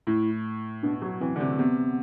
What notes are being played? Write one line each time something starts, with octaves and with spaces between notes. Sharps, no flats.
A2 E4
B2 D4
F#3
E3 C4
D3
C3
C3 B3